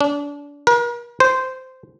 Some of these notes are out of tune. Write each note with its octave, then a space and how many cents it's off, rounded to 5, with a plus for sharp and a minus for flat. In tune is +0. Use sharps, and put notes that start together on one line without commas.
D4 -30
A#4 +40
C5 -15